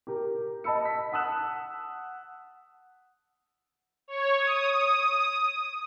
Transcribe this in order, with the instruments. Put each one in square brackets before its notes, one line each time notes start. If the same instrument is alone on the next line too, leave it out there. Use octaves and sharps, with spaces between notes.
[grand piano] G4 A#4
D#5 A5 B5 E6 C#7
B6
F#5 A5 D#6 E6 F#6 E7
[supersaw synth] C#5
D#6